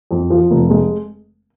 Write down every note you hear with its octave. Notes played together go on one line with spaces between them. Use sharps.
F2
F3
F1
G#3